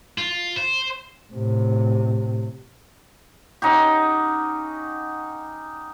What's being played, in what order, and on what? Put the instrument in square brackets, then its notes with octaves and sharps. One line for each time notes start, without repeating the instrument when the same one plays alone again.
[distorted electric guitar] F4
C5
[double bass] A2 C3
[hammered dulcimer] C#4 D#4 F#4 G4